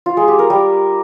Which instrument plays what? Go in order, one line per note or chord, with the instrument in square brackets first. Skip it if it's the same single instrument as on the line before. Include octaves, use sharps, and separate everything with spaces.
[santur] F4
G#3
G4
A#4
G3